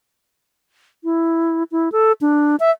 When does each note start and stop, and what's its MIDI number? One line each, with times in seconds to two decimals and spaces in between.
1.04 1.63 64
1.72 1.92 64
1.92 2.12 69
2.21 2.56 62
2.60 2.71 76